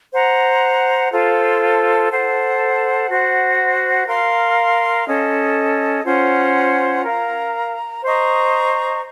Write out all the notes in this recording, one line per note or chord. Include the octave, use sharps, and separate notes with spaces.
C5 F#5 A#5
F4 A4 C5
A4 C5 F#5
F#4 C5 F#5
A#4 F5 C6
C#4 A4 D#5
C#4 F4 C5 F#5
A#4 F5 A#5
C5 D#5 A#5 C#6